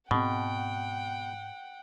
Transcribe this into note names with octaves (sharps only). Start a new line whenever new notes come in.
G#2 B2 C4 F#5 G5